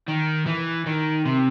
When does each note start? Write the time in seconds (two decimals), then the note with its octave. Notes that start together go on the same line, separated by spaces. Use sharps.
0.08 D#3
0.47 E3
0.86 D#3
1.26 C3